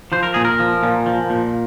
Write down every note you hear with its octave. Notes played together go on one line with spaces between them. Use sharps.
F3 C5
A#4
A#2 G#4
A#4
F3
A#2
F3
A#2